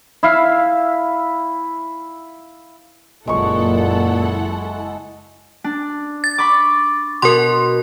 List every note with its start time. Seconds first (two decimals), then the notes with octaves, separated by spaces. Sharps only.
0.23 E4 E5 F5
3.27 F#1 A#2 G#3 E4 A4 F#5 C#6
5.64 D4
6.24 A6
6.38 B5 C#6 D6
7.22 B2 A#4 C6